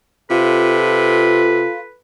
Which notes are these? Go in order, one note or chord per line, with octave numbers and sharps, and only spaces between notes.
C3 F4 A4 B4